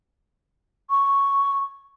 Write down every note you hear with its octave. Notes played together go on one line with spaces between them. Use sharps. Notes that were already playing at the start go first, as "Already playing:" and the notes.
C#6